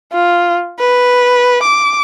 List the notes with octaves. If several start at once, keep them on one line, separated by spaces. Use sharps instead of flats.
F4
B4
D6